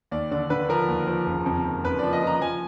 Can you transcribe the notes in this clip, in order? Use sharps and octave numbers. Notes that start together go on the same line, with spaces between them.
D#2 D5
D3 D5
D3 B4
F3 A#4
D#2
F3
F#1
F2
F2
F#1 B4
F3 D5
D#5
F3 A#5
F3 G#5